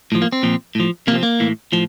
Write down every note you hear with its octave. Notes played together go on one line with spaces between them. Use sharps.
A2 F3
A#3
C4
A#2 F3
A2 F3
C3 F3 A#3 C4
A#3
A2 E3
A2 F3